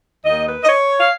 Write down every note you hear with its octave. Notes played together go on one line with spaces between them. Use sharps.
D#2 D#3 A#3 D#4 D#5
B4
D#5
C#5
F5